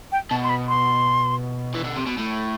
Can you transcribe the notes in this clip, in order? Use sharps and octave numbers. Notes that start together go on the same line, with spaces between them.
G5
B2 A5
C6
B5
C6
E3
D3
C3
B2
A2